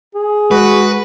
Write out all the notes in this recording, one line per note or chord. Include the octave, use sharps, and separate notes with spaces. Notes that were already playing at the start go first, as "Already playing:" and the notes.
G#4
G#3 F#4 B4